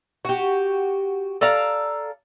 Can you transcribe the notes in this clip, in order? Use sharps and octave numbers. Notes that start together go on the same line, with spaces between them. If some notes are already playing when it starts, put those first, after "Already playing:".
F#4 G4
A4 D5 F5 A#5